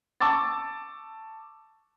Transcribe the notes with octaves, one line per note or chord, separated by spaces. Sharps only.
A5 C#6 D6 E6 A6